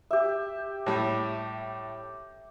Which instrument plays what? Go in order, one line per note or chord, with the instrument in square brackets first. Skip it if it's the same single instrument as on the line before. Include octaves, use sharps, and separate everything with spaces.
[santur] G4 E5
[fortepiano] A2 G3